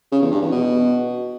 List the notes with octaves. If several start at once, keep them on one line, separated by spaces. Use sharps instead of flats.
C#3
E2
G2
E2
B2